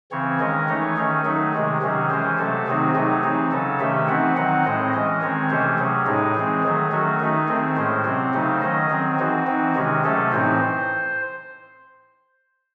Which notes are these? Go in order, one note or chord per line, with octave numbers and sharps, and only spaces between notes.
C#3 E3 C4 C#5
D#3 G#3 C#4 D#5
E3 A3 D#4 C#5
D#3 A3 C#4 G#4
D#3 F#3 A3 D#4 G#4
C3 D#3 G#3
C3 D#3 F#3 C#4 G#4
E3 G#3 C#4 C5
C3 F#3 A3 A4
C3 D#3 F#3 C4 D#4 G#4
C3 F#3 A3 D#4 G#4
E3 C4 D#4
C#3 F#3 C#4 A4
C3 D#3 A3 C#4 E5
E3 C4 D#4 F#5
D#3 F#3 C4 D#4 F#5
A2 G#3 C4 D#5
E3 G#3 C#4 D#5
D#3 G#3 C4 C#5
C3 E3 A3 C#4 C5
C3 F#3 C#4 G#4
A2 G#3 D#4 G#4
E3 G#3 C4
D#3 F#3 A3
D#3 F#3 A3 C#4 F#4
D#3 A3 D#4 G#4
D#3 A3 C4
A2 G#3 C#4 C5
C3 F#3 C4
C#3 F#3 A3 D#4
D#3 F#3 C#4 D#5
D#3 F#3 C4 G#4
E3 C4 D#4 F#4
E3 C4 D#4
C3 D#3 G#3 C#4 G#4
C3 F#3 A3 C#4 A4
A2 E3 C4 D#4 C5